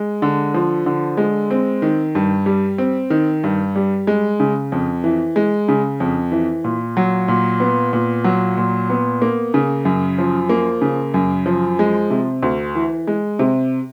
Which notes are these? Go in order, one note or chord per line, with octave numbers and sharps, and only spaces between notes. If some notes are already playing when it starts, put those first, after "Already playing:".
Already playing: G#3
D3
F3
D3
G#3
C4
D#3
G2
G3
C4
D#3
G2
G3
G#3
C#3
F2
E3
G#3
C#3
F2
E3
A#2
F#3
A#2
B3
A#2
F#3
A#2
B3
A#3
C#3
F#2
F3
A#3
C#3
F#2
F3
G#3
C3
D2
E3
G#3
C3